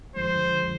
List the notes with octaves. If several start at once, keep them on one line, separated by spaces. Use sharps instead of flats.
F2 D3 F3 G#3 C5